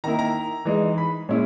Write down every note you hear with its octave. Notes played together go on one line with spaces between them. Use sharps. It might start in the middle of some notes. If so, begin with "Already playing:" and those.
D#3 A#3 E4 A#5
A#5
E3 G#3 D#4
B5
A#2 G#3 C#4 E4